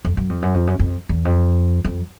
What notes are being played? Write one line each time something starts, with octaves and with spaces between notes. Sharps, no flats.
F2
F#2
F2
F#2
F2
F#2
F2
E2
F2
F2